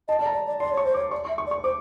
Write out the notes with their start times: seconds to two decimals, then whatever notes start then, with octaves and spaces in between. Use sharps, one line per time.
0.08 D#5 A5
0.19 D5 A5
0.26 A#5
0.34 D5
0.47 D5
0.60 D5 C6
0.72 C#5
0.77 C#6
0.85 C5
0.94 C#5 D6
1.11 D5 C#6
1.25 E5 C#6
1.38 C#6
1.47 D5
1.51 C#6
1.64 C5 D6